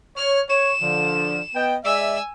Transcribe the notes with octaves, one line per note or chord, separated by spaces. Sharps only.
C#5 F6
C#5 E7
D3 F3
B3 D#5 G5
G#3 D5 E5 G#5 E6